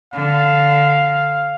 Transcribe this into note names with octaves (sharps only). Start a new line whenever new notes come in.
D3 F5